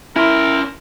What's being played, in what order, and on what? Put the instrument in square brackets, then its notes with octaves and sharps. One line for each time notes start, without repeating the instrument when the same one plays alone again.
[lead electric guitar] C#4 C6 [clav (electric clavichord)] E4 [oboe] A#4